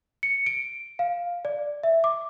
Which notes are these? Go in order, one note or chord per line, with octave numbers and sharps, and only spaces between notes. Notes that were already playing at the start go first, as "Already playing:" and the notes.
C#7
D7
F5
D5
E5
D6